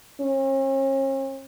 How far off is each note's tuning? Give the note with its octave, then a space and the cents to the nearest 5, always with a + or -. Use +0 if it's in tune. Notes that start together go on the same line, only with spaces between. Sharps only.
C#4 -45